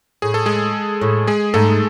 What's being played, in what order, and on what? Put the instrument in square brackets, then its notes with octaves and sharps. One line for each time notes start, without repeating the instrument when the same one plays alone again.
[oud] A2 [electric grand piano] G#4
[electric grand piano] A4
G#3 G#4
[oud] A2
[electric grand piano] G#3 G#4
[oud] G#2 [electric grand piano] A3 A4